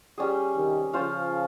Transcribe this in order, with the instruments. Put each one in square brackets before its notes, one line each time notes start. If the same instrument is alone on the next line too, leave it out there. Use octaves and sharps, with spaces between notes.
[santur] G3 C#4 G#4
[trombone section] C3 D#3
[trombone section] C#3 F3 [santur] C#4 F4 C5 F5